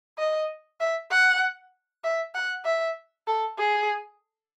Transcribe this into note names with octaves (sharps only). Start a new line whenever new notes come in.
D#5
E5
F#5
E5
F#5
E5
A4
G#4